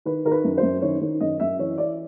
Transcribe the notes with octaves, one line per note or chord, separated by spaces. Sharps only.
D#3 B4
D#3 A#4
B4
F#2
C5
F#2
D#3 C#5
D#3
F#2 D#5
F#2 E5
E3 C#5
E3 D5